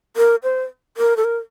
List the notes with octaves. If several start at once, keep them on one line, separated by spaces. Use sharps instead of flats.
A#4
C5
A#4
A4
A#4